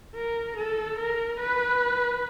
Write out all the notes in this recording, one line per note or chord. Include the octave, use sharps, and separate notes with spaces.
A#4
A4
A#4
B4